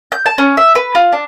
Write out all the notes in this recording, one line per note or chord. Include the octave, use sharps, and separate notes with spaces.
G6
A5
C#4
E5
B4
F4
D4